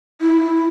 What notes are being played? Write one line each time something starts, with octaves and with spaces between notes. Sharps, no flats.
E4